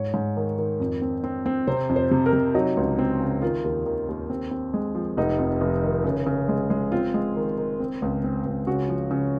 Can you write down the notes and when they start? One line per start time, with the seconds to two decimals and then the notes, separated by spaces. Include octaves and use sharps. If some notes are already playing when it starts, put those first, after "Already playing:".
Already playing: G#2 C#5
0.14 G#2
0.37 D#3
0.59 D#3
0.80 F2
1.02 C4
1.24 C4
1.46 C4
1.67 C3 C5
1.89 F2
1.96 C5
2.11 C3
2.26 A#4
2.33 C3
2.55 F#3 D#4
2.77 C#2
2.99 C4
3.21 C#3
3.42 D#3 F4
3.64 D#2
3.86 D#3
4.09 D#2
4.30 C4
4.51 C4
4.74 G#3
4.95 F3
5.17 F1 D#4
5.39 F2
5.61 F1
5.84 D#3
6.04 C#3
6.27 C#3
6.49 G#3
6.70 G#3
6.92 C4 F4
7.14 G#3
7.36 D#3
7.58 D#3
7.80 C4
8.02 C#2
8.24 C4
8.46 C#2
8.67 C#3 F#4
8.89 F3
9.11 C#3